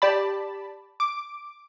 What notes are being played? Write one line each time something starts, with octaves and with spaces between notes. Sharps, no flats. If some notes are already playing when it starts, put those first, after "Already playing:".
G4 D5 A5 B5
D6